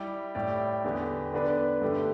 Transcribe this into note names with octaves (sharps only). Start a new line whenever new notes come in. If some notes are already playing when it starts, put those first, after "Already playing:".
Already playing: G3 E4 G4
A2 G3 E4 G4 D5
E2 D3 B3 G4
D3 B3 D4 B4 D5
G2 D3 A3 G4